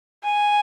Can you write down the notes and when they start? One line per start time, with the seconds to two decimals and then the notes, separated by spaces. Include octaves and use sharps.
0.24 G#5